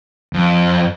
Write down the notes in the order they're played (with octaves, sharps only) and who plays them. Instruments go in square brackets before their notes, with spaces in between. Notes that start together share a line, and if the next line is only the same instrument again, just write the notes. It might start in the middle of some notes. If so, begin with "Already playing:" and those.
[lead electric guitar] F2